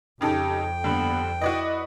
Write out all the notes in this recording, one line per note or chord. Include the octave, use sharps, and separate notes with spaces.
F2 C#3 D#4 G4 A4 G5
G2 D3 A#3 B3 B5
E4 F#4 B4 D5 D#5